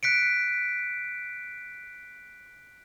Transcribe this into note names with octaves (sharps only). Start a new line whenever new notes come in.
F#6 B6 C#7 D7